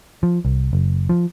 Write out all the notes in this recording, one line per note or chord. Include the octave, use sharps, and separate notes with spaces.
F3
C2
F#1
F3